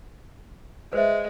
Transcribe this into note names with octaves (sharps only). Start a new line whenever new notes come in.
G#3 B4 C5 E5